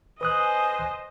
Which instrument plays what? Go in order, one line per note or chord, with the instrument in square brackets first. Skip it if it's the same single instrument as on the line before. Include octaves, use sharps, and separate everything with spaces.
[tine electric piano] B4 D#6 F#6 [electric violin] C5 D#5 [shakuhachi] G#5